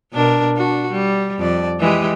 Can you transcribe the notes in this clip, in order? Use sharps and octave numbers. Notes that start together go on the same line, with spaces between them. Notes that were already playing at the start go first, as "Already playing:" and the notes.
B2 D4 A#4
D4 F#4
G3
F2 D5
E3 G#3 G4